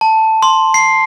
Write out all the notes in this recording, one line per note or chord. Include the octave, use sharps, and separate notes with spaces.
A5
C6
C7